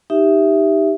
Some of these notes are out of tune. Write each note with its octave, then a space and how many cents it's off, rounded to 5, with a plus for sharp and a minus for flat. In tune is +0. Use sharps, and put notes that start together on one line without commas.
D#4 +0 G4 +0 E5 +0